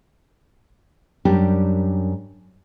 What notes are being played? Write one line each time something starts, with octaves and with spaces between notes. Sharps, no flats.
F#2 G3 D4 G4 A#4